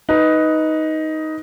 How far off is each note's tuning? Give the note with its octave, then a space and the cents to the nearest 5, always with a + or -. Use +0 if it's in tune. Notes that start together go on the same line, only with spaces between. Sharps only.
D#4 +10 B4 +0